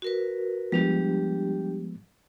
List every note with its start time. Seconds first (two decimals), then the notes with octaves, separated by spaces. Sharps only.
0.02 F#4 A#4 B4
0.72 F3 G3 G#3 B3 D4 G4